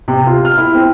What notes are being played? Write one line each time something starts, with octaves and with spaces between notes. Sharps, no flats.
C3
F4
F6
E4
C4